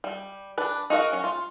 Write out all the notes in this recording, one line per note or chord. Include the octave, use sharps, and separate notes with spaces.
G3
D4 B4
D#4 F#4 A#4 F5
F#3 C#4
F4